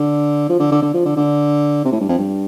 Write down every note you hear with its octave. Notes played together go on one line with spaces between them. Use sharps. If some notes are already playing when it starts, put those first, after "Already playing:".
Already playing: D3
F3
D3
D3
D3
F3
D3
D3
C3
A2
G2
F2
G2